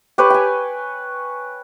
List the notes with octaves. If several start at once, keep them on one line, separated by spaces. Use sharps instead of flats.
G4 B4 C#5
G5 G#5